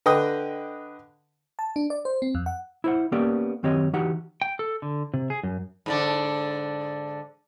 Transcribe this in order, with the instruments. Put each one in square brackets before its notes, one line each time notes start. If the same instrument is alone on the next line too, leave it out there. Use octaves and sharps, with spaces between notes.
[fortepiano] D3 B4 D#5 G5 D#6
[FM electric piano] A5
D4
D5
C5
C4
F2
F#5
[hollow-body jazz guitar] E4 C5 F#5
A#3 B3 C#4 G4 A#4 D5
F#2 D#3 C4 G4 C#5 D#5
E3 D#4 F#4 G4 F#5 G5
[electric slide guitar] G5
A4
D3
C3
G#4
F#2
[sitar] G#2 D3 D4